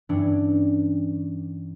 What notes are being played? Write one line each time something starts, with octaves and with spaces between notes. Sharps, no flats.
G2 E3 C#4 D4